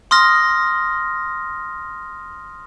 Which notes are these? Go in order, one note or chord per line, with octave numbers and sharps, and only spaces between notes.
C6 D#6 F6 A#6